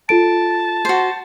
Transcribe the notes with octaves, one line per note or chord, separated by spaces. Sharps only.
F4 A4 A5 D7
F#4 C5